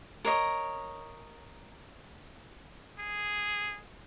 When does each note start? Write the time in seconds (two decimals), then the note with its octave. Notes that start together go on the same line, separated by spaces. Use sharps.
0.25 A#4 C#5 D#5
3.00 G#4